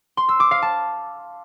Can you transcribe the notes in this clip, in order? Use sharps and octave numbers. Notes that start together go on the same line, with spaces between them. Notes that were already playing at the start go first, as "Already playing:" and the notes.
C6
E6
D6
F5
A5